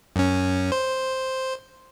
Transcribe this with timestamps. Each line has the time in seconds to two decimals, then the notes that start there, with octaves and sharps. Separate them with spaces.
0.16 F#2 C#4
0.72 C5